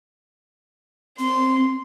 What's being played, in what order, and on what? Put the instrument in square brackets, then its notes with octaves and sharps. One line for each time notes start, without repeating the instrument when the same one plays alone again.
[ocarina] C4 [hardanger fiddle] C6